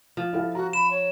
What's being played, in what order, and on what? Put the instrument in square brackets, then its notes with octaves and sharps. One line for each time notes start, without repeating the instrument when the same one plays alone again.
[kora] F3
[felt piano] E4 A4 F5
[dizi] F#4 [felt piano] A#5
[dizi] B5 [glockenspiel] E7
[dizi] C#5